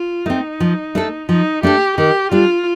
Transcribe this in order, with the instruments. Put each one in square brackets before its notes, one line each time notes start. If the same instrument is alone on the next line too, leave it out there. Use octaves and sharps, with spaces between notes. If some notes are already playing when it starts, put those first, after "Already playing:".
Already playing: [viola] F4
[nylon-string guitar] A3 C4 [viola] D#4
[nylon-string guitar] F3
A3 D4 A4
[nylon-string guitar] F3 [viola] D#4
[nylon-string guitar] A3 D4 A4 [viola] G4
[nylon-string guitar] D#3 [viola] G4
[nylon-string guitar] G3 D4 [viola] F4